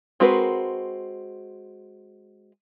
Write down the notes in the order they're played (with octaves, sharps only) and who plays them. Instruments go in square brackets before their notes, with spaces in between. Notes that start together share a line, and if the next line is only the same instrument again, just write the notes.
[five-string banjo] G#3 C4 F#4 A#4 B4